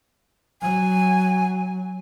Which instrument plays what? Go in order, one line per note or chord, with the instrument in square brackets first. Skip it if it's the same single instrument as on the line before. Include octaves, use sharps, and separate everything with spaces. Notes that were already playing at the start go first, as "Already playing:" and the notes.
[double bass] F#3 [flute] G#5